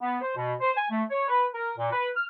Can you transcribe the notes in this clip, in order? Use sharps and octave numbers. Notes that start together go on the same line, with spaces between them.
B3
C5
B2
C5
G#5
A3
C#5
B4
A#4
A#2
B4
F6